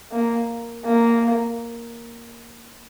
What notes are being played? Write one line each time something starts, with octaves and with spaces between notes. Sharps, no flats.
A#3
A#3